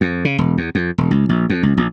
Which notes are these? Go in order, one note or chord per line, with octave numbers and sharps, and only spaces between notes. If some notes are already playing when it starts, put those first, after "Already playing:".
F2
C#3
E1
E2
F2
E1
C#2
A#1
F2
C#2
A#1